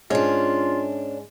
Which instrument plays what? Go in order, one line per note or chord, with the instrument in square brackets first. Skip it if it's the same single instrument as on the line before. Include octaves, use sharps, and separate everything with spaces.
[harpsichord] G#2 [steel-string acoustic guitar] C#4 D4 [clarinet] F4